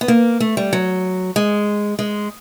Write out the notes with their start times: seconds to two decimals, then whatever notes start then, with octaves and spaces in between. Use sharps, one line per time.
0.01 B3
0.08 A#3
0.40 A3
0.57 G3
0.73 F#3
1.36 G#3
1.99 G#3